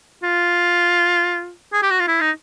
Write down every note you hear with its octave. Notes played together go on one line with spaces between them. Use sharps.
F4
G#4
G4
F#4
F4
E4
D#4